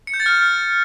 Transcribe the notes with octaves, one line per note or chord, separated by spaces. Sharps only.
C#7
G6
A6
F6